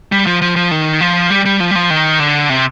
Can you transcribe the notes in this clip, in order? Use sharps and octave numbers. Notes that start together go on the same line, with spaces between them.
G3
F3
F3
F3
D#3
F3
G3
G3
F3
G3
F3
D#3
D3
C3